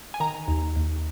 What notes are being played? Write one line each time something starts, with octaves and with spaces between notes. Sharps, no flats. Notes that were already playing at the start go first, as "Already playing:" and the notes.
G#5
D#3 A#5
D#2
D#2